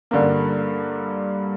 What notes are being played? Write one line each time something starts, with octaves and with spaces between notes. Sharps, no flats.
G2 D3 G3 A#3